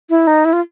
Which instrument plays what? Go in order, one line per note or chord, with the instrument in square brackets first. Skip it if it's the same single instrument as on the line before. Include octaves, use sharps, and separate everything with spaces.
[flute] E4
D#4
E4
F4